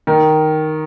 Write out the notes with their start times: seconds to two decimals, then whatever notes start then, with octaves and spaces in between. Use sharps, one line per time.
0.07 D#3